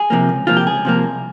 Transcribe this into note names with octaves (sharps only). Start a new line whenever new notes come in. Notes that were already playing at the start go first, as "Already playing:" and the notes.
Already playing: G#4
C3 F3 A#3
C#2
C3 F3 A#3 F4
G4
C#2 G#4
C3 F3 A#3
C2